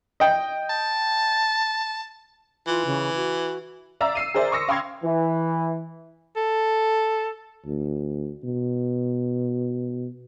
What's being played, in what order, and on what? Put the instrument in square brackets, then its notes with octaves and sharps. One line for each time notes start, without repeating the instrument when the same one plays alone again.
[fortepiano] D#5 G5
[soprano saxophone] A5
[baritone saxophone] E3 [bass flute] F4
[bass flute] C#3
F#4
[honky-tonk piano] D5 E5 F5 A#5 E6
E6 C7 D#7
G#4 A#4 C5 D5 E5
C6 C#6 D#6 E6 A#6 C#7
F5 G5 C6 C#6 G#6
[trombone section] E3
[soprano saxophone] A4
[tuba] D2
B2